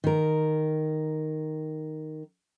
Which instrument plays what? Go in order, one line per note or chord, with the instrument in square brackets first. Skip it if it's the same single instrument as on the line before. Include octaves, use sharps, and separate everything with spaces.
[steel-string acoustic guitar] D#3 A#4